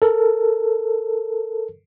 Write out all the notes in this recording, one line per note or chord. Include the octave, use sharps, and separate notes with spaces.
A4 A#4